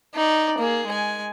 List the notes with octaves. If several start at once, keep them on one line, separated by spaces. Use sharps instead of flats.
D#4 D5
A#3 G#4
G#3 G#5